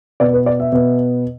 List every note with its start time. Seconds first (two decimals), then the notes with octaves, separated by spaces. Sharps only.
0.20 B2 B3 D5
0.33 B4
0.46 D5
0.60 E5
0.72 B2 B3